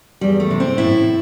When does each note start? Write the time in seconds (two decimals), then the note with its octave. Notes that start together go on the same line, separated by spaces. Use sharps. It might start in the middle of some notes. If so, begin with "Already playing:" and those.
0.21 E2 G3
0.40 A3
0.50 C3 E3
0.60 C4
0.78 A2 E4